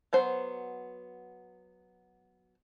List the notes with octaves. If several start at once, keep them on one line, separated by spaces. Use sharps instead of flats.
F#3 B3 C5